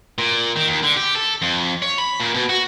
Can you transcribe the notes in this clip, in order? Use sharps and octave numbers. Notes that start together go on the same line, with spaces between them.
A#2
D#3
D#2
D3
G4
A4
F2
C#5
B5
A#2
B2
F#4